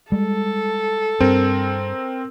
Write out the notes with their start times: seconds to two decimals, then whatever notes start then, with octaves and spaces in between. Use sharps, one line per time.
0.12 G3 G#3 A4
1.20 G2 C4 A#4